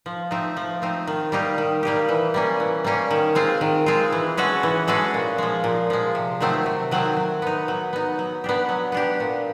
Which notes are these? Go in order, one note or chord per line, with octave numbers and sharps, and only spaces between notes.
F3
A3 C4 D#4
F3
A3 C4 D#4
D#3
G3 A#3 D#4 G4
D#3
G3 A#3 D#4 G4
E3
G3 A#3 C#4
E3
G3 A#3 C#4
D#3
G#3 C4 F4
D#3
G#3 C4 F4
E3
G#3 C#4 F#4 A4
E3
G#3 C#4 F#4 A4
A#2
F3 G#3
A#2
F3 G#3
C3
D#3 F#3 A3 C4
C3
D#3 F#3 A3 C4
F#3
B3 D#4
F#3
B3 D#4
F#3
B3 D4 G4
F#3
B3 D4 G4
A#2